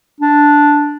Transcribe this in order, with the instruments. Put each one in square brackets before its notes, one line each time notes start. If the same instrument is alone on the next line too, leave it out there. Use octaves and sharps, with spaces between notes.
[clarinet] D4